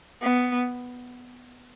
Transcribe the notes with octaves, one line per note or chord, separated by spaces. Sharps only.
B3